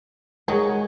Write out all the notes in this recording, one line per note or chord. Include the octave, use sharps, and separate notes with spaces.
D#3 F#3 G#3 G#4 D#5 F#5